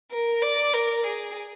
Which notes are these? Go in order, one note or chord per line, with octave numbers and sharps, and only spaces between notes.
A#4
D5
A#4
G#4